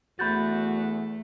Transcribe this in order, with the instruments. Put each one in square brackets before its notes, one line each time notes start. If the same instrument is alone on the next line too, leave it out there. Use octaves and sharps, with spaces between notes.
[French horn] E2 [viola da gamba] A3 [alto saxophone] F#4 [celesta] B5 G6 A6